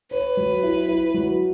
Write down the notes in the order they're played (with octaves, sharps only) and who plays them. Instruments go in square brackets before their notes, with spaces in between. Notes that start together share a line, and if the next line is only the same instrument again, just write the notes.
[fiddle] B4 [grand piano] C#5
[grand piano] F#3
E4
E4
F#3